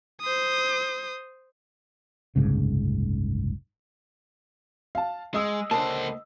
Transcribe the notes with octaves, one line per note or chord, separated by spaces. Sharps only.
C5 D#6
F#1 C2 G#2 C#3
F5 A5
G#3 D#5 D#6 E6
C#2 D3 A#3 C5 A5